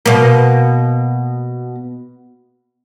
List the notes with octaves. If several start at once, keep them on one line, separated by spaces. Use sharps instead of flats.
B2 A#3